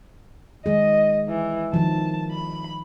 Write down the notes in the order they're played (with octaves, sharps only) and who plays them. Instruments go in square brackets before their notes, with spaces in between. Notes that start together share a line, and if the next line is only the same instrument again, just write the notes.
[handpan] D#3 G#3 G#4 [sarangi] D#5
[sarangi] E3
[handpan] D#3 F3 [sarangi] A5
[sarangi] B5